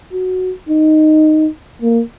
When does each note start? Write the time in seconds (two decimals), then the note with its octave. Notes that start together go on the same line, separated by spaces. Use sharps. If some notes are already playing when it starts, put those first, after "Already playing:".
0.13 F#4
0.69 D#4
1.82 A#3